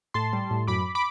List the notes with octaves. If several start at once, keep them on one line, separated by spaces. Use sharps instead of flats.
A2 A5 C6
G3
A2
F#2 B5 D6
B5 D6